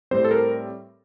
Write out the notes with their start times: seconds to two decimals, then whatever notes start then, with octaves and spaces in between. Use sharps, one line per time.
0.11 A2 G3 C4 C5
0.25 A4
0.31 A#4